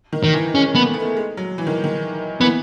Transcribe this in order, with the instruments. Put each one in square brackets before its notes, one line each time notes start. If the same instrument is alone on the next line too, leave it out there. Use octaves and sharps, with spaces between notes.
[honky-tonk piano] D#3
[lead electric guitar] D#3
[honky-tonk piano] E3
[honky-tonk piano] G#3 [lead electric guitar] C#4
[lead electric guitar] B3
[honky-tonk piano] A3
B3
A3
G#3
F#3
E3
D#3
D#3
[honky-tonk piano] E3 [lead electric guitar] B3